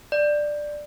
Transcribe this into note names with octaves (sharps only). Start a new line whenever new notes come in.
D5